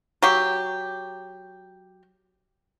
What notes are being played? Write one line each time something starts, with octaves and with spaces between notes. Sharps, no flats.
F#3 G4